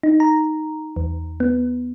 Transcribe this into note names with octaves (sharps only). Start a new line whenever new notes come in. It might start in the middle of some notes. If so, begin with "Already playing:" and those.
D#4
A#5
E2
B3